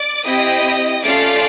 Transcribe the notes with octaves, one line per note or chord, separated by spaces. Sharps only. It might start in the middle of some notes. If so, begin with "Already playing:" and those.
Already playing: D5 D6
C4 E4 G4 D#5 D#6
A3 C#4 F4 A4 D5 D6